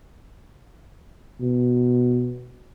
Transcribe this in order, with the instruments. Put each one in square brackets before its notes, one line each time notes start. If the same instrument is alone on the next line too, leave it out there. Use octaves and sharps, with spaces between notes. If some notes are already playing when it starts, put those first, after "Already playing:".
[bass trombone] B2